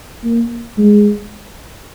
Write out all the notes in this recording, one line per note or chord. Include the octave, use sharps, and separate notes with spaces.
A#3
G#3